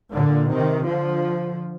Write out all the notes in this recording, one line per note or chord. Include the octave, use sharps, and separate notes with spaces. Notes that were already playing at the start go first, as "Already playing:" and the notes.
A#2 D3
C3 D#3
D3 F3